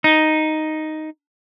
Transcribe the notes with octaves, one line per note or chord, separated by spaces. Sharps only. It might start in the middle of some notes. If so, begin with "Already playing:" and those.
D#4